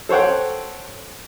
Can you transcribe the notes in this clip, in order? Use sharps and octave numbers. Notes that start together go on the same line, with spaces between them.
A4 C5 C#5 F#5 G5